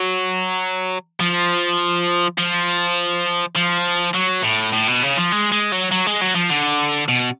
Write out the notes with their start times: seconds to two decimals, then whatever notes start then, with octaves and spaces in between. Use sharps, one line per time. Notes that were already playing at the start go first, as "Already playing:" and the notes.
Already playing: F#3
1.20 F3
2.38 F3
3.56 F3
4.15 F#3
4.44 A2
4.73 A2
4.88 B2
5.03 C#3
5.17 F3
5.32 G#3
5.52 G#3
5.72 F#3
5.91 F#3
6.06 G#3
6.21 F#3
6.35 F3
6.50 D3
7.08 B2